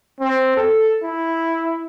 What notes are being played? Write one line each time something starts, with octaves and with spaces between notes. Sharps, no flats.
C4
A4
E4